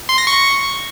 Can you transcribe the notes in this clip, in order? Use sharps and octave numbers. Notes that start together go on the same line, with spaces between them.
C6
A#6
C#6